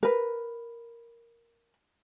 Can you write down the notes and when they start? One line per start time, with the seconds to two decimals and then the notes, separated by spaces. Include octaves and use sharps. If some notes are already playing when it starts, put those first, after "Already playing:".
0.03 A#4 B4